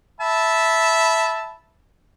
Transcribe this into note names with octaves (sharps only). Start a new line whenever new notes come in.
E5 A5 B5